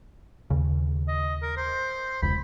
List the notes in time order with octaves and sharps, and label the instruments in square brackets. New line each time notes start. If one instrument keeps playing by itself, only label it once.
[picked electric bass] D#2 C#3
[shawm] D#5
A#4
C5
[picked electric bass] E1 C#2 [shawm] B5